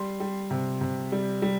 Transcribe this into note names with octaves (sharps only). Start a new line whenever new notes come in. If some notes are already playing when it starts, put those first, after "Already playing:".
Already playing: G3 C6
G3
C3
C3
G3
G3